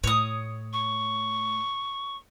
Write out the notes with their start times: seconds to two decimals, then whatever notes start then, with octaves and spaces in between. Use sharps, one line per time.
0.04 A2 C#5 D#6
0.73 C#6